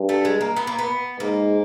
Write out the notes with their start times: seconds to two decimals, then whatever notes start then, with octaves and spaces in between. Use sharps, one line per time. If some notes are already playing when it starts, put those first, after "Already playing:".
Already playing: G2
0.09 A3
0.25 G#3
0.41 A#3
0.56 B3
0.67 A#3
0.79 B3
1.20 G#2 A#3